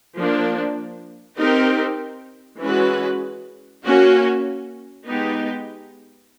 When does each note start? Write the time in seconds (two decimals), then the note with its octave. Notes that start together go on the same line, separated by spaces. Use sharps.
0.16 F3 A#3 D4
1.38 C4 D#4 G4 A#4
2.60 E3 G#3 C#4 F#4 B4
3.84 A#3 C#4 F#4
5.06 G#3 B3 D#4 G4